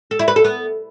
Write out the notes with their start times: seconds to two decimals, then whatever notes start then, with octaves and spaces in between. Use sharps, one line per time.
0.11 A4
0.19 E4
0.28 B4
0.36 A4
0.44 B3